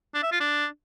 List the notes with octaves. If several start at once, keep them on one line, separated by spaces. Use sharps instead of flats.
D4
E5
F4
D4